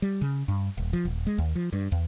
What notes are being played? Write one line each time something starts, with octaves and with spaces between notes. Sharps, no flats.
G3
C#3
G2
D#1
F3
D#1
G#3
D#2
F3
G2
E2